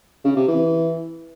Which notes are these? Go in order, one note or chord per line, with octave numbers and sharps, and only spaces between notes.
C#3
C3
E3